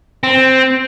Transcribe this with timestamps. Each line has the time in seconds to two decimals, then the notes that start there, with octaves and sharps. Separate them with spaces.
0.23 C4